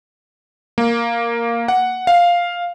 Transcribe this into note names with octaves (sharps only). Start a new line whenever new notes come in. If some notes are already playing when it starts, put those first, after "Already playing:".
A#3
F#5
F5